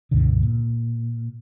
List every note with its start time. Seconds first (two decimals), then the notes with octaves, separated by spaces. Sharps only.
0.11 C#2 G2 B2 D3
0.43 A#2